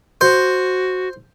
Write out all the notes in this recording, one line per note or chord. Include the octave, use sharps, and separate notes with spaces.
F#4 C5